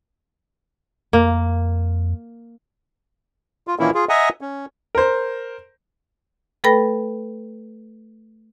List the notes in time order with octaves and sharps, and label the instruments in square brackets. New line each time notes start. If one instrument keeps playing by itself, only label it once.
[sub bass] F2 [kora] A#3
[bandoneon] F4
A#2 D#3 E3 A#3 C#4 E4
F4 G#4
D#5 E5 F#5 G#5 A#5 D#6
C#4
[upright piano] A#4 C5
[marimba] A3 A4 B4 G5 B5 A#6